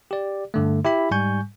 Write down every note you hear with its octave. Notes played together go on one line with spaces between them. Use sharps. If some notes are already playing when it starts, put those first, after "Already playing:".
G4 D5
G2 D3 A3
E4 G4 E5 B5
G#2 G3 G#5 C#6 G6